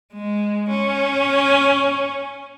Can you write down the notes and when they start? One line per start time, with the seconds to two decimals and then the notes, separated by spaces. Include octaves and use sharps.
0.13 G#3
0.70 C#4